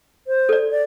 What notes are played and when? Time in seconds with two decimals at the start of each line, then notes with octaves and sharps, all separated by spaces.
0.27 C5
0.49 A4 D5
0.71 D5